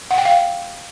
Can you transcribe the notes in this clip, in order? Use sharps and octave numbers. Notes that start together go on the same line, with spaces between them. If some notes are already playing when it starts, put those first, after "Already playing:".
F#5
G5
F5